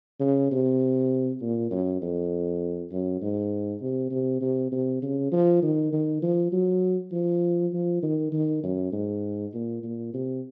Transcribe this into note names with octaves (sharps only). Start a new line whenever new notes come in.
C#3
C3
A#2
F#2
F2
F#2
G#2
C3
C3
C3
C3
C#3
F3
D#3
D#3
F3
F#3
F3
F3
D#3
D#3
F#2
G#2
A#2
A#2
C3